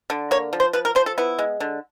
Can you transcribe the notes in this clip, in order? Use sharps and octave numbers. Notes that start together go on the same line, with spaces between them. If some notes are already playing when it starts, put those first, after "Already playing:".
D3
A#3 C#5
F3
C5
F3 B4
A#4
F3 C5
A4
B3 E4
G#3
D3